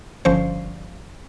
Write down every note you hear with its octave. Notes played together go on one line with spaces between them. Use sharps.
G1 D3 F3 C#4 C5